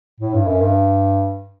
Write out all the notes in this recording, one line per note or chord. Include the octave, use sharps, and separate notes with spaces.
A2
G2
F#2
G2